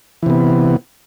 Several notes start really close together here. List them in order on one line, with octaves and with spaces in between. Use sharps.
E3 C3 B3